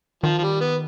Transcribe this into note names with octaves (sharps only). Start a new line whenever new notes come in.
D#3 F3
F3
G3
B3